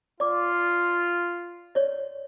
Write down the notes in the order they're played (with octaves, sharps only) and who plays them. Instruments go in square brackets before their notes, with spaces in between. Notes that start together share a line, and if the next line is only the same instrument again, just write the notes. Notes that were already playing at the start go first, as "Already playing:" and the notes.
[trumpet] F4 [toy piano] D5 D6
[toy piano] C#5 D5